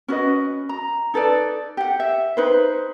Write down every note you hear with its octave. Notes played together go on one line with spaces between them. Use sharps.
C#4 F#4 B4 D#5
A#5
D#4 A4 B4 D5
G4 F#5
E5
D#4 B4 C5